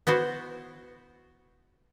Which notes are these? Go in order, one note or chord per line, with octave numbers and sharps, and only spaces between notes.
B3 E4 F#4 C5